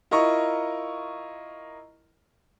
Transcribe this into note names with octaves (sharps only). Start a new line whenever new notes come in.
E4 F4 A#4 D#5 A#5 C#6